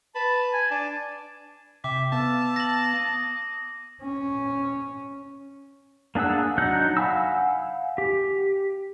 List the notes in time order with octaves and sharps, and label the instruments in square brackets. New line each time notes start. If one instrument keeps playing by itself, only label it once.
[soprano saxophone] B4 [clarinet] A5
[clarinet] G#5
[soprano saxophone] D4 [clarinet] A5
[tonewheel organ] C3 G5 [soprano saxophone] E5 [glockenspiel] D6
[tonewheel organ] B3 F5 E6 [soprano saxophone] A5
[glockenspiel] A#6 F#7
[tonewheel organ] D#6
[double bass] C#4
[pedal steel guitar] A#3 D4 G#4 F#5 E6
F#3 D4 D#4 F#5 G6
F5 F#5 G#5 B5 E6
G4